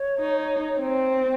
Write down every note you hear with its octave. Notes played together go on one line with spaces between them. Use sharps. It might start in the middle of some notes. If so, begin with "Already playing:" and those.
Already playing: C#5
D#4
C4